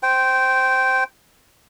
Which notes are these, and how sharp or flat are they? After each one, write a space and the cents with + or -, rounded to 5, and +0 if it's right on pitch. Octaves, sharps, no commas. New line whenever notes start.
C5 +0 G5 -10